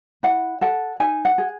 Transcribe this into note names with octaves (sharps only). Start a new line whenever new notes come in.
E4 F#5
A4 F#5
D#4 G#5
F#5
G#4